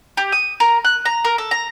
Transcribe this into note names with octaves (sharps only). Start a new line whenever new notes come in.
G4
D#6
A#4
F#6
A#5
A#4
A4
A#5